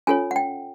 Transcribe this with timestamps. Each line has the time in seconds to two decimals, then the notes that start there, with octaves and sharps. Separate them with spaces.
0.07 C#4 F4 A4 C#5 G#5
0.31 F#5
0.36 G5